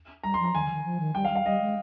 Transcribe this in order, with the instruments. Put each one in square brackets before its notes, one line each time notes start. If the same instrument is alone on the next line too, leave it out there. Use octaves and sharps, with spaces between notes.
[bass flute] G3 [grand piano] A#5
[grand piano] C6
[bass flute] F3
[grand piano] A#5
[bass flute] D#3 [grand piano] G#5
[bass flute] D3
F3
D#3
F3
D#3
[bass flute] G3 [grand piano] G5
[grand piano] F5
[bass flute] G3
[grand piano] F5
[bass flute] G3 [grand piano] D#5
[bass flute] G#3